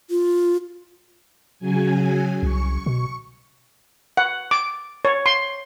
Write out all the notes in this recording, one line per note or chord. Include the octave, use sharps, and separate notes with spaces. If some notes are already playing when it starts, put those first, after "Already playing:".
F4
C#3 F#3 G#5
C2 C#6
B2
F#5
D6
C#5
C6